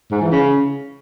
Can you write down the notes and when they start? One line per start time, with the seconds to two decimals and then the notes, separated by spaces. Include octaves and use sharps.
0.11 G#2
0.21 E3
0.32 C#3